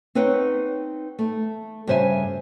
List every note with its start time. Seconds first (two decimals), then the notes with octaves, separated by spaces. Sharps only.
0.15 C4 D#4 B4 C#5 F#5 G5
1.19 A3
1.87 G2 C#3 C5 E5 G#5